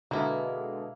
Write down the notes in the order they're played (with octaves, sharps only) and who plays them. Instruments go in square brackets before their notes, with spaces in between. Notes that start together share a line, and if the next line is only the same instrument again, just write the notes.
[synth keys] B2 D3 G#3 [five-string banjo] A#3 E4